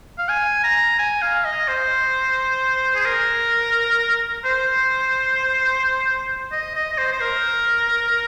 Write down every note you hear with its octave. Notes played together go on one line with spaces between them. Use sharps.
F5
G#5
A#5
G#5
F5
D#5
C5
G#4
A#4
C5
D#5
D#5
D#5
C5
C5
A#4